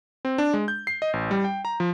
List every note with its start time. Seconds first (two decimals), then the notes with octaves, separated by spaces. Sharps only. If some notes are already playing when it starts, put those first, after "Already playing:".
0.25 C4
0.38 D4
0.54 G#3
0.68 G6
0.87 C7
1.02 D#5
1.13 A1
1.31 G3
1.44 G5
1.65 A#5
1.80 F3